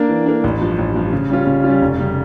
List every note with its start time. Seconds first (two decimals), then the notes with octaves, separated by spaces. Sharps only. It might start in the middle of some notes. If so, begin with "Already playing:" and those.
Already playing: A#3 D4
0.09 E3
0.26 A#3 D4
0.44 A1
0.61 G2 F3
0.78 A1
0.95 G2 F3
1.13 C#3
1.30 G3 C#4 F4
1.47 C#3
1.64 G3 C#4 F4
1.82 F1
1.99 C#3 G3